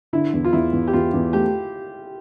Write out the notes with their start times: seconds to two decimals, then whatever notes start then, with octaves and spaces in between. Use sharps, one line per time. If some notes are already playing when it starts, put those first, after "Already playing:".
0.13 D3 E4
0.34 E2
0.45 F4
0.53 E2 E4
0.73 E2
0.88 G4
0.93 E2 F4
1.14 E2
1.33 A3 G4